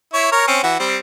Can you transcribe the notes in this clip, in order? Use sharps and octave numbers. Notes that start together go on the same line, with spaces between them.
E4 C#5
A#4 C#5
C4 C#4
E3 F#4
G3 C4